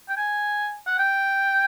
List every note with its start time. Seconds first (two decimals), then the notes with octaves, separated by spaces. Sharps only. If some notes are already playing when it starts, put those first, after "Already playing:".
0.09 G5
0.17 G#5
0.87 F#5
0.99 G5